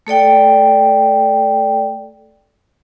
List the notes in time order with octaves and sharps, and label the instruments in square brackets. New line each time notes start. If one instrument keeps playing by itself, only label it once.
[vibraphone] A3 A4 D5 G5